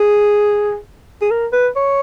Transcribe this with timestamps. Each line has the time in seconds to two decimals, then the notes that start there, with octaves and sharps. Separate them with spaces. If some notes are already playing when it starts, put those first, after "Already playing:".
Already playing: G#4
1.22 G#4
1.31 A#4
1.52 B4
1.76 C#5